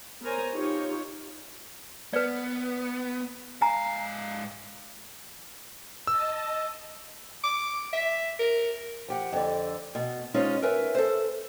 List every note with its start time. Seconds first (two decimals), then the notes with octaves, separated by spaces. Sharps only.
0.22 B3 A#4 C5 C#5 G#5 A#5
0.54 D#4 F4 G4 C#5
2.13 B3 B4 D5
3.62 G#2 F5 G#5 A#5
6.07 D#5 A5 E6
7.43 D6
7.93 E5
8.39 A#4
9.08 F3 G4 F#5
9.32 F2 D3
9.95 B2
10.34 G#3 C#4 D#4 F4 C5
10.62 A#4 B4 C#5 E5 G#5
10.95 A4 C5